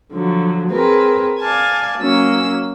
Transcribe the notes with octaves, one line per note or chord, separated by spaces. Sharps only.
D3 F3 F#3
C4 G#4 A#4 B4
D5 F5 G#5 A5
F#3 A#3 C#4 E6